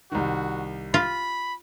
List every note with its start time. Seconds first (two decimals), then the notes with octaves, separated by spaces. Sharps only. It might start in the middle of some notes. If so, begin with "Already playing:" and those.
0.12 C2 D#3 F#4
0.94 F4 B5